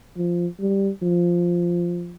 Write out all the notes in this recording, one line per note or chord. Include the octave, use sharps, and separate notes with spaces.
F3
G3
F3